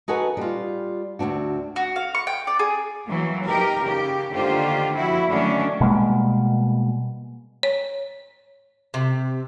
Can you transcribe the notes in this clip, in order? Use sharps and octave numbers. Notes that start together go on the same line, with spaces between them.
D#4 F#4 G#4 A4 B4
G3 F4
D2 G#2 C4 D4 F#4
F#4
F5
C#6
G5
D5
G#4
E3 F#3 A#3
D#4 G4 A#4
C#3 G4
D3 D#3 A#3 F4 G4 C5
F3 E4 F#4
D3 D#3 F#3 A3 C#4 D4
B2 G3 G#3 A#3
C#5
C3